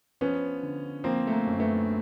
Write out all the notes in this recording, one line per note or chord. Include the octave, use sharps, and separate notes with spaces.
F3 B3 C#4
D3
F3 A#3 C4
A3
A#3
F#2
A3 B3